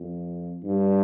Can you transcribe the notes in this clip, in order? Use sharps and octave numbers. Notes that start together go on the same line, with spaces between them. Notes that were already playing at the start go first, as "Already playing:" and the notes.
Already playing: F2
G2